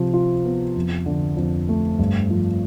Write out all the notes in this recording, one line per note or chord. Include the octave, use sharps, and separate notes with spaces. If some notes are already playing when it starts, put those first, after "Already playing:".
Already playing: C3 F3
F4
B3
F2
D3
F2
A3
G2
F3